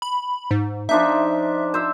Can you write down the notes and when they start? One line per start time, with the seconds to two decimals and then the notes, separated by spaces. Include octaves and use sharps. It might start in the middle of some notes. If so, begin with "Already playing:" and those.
0.02 B5
0.51 G#2
0.89 F3 D4 D#4 E5
1.74 C5 E5